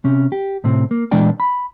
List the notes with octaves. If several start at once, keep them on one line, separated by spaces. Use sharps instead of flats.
C3 C#4
G4
A2 C3 C4
A#3
A#2 E3 G#3 D4 D5 G5
B5